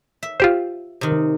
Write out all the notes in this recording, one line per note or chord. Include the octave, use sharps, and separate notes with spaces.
E5
F4 G4 C5
C3 D#3